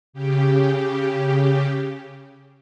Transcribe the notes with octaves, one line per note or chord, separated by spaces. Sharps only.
C#3 G4